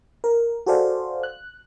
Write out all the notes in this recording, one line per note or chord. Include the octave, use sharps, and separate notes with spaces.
A#4
F#4 G#4 A4 C5 D5 F5
F#6